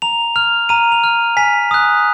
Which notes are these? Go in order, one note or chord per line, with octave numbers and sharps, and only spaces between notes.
A#5 F7
F6 F7
A#5 D#7
F7
F6
G#5 B6
D#6 F#6